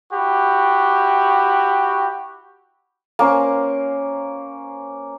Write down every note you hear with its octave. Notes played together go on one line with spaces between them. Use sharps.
E4 F#4 G4
A#3 C#4 C5